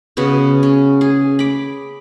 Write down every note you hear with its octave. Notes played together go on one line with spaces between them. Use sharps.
C#3 B3 F#4
C#4
G#4
B5 D6